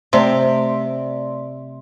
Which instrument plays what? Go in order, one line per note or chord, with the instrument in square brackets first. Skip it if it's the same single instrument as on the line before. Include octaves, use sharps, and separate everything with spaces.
[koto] C3 [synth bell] A3 D5 C6